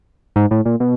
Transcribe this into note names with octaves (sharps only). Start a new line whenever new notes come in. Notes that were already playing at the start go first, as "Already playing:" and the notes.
G#2
A2
A#2
B2